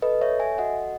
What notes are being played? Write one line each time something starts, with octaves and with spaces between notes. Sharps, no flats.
A4 B4 D#5
C#5 E5
A4
E5 G#5
F#4 D#5 F#5